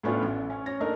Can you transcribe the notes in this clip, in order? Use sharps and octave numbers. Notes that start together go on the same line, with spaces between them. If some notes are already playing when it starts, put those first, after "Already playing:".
A2 A3 B3 C#4 D4 F4
A1
C#4
C#4 C#5 A#6
A3 A#3 D4 D#4 A#4